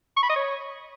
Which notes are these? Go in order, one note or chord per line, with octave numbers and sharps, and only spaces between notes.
C#6
B5
D#5
C#5